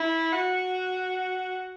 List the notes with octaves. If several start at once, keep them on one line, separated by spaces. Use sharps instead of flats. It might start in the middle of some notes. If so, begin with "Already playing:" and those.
Already playing: E4
F#4